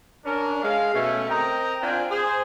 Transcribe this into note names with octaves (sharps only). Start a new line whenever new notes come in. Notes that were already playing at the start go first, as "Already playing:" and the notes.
C#4 D4 A#4
G#3 F5
B2 A3 C#4
C4 A#4 D#5 G5 A#5
C4 D4 F4 G5 G#5
G#4 C5